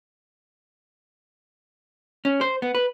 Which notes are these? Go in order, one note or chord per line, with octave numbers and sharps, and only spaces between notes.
C#4
C5
B3
B4